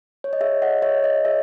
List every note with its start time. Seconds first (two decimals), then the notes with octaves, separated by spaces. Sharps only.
0.24 C#5
0.33 D#5
0.41 G#4 C#5 E5
0.62 D#5 F#5
0.82 G#4 C#5 E5
1.04 D#5
1.25 G#4 C#5 E5